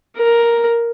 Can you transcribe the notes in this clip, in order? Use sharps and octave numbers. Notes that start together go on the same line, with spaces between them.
A#4